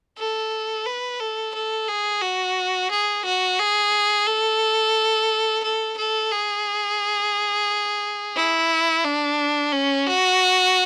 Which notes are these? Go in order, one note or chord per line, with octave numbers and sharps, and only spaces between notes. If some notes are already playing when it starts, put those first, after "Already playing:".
A4
B4
A4
A4
G#4
F#4
G#4
F#4
G#4
A4
A4
A4
G#4
E4
D4
C#4
F#4